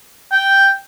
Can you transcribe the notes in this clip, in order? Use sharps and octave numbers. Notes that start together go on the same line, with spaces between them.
G5